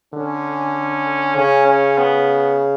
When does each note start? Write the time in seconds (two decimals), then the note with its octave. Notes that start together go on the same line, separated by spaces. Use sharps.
0.14 D3 C#4
1.36 C#3 C#4
1.67 C#4
1.97 B3